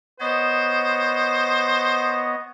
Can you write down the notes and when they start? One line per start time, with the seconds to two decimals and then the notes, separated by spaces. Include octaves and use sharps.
0.20 B3 C5 C#5 D#5